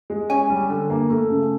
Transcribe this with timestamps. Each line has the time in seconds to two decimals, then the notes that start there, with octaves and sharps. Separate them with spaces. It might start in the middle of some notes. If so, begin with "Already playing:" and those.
0.10 G#3
0.29 C#4 G#5
0.50 G3
0.69 D3
0.90 A#3
1.10 A3
1.30 C#3